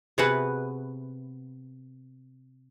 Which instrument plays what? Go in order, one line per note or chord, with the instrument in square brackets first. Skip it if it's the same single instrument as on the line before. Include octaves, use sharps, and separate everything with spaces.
[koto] C3 B3 E4 F#4 G#4 B4